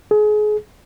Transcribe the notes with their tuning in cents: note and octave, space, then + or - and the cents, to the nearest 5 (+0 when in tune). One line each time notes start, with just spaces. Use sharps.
G#4 +30